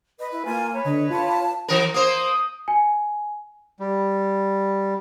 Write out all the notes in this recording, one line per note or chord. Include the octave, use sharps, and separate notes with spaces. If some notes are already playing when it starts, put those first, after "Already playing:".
B4 D#5
E4
A#3 F4 G#5
B4 C#5
D3 D#5
F4 A5
E3 A#4
A#3 C5 D#6
G#5
G3